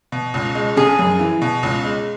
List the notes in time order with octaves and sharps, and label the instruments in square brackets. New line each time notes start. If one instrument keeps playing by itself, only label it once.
[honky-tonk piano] B2
C#2
G#3
[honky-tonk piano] C#3 [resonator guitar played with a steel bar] G#4
[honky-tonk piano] F#2
E3
B2
C#2
G#3